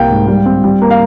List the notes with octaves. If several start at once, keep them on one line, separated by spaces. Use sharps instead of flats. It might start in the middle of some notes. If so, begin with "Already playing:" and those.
Already playing: C2 A#3 F5 G5
G#2
G3
C4
G3
A#3
F5